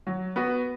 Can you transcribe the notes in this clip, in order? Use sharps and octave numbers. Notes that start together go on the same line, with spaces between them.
F#3
B3 F#4 B4